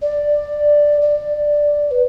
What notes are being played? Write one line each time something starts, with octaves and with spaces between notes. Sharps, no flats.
D5
D5
B4